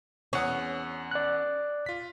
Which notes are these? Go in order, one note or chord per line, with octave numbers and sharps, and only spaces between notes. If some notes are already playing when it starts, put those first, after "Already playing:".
E2 C#4 F#5 D#6
D5 F#6
F4 B6